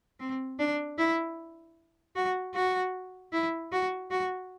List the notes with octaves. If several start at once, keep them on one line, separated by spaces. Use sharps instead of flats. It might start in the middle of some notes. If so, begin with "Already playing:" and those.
C4
D4
E4
F#4
F#4
E4
F#4
F#4